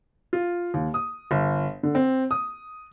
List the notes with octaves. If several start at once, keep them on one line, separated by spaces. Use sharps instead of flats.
F4
D#2
D#6
G1
D3
C4
D#6